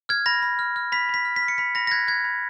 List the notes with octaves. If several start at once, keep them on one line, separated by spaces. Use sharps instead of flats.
F6 G#6
B5 A#6
B5
F6
F6
B5 B6
B5 B6
F6
B6
F6
C#7
B5 B6
B5 A#6
A#6
F#6 G#6
F#6 G#6
B5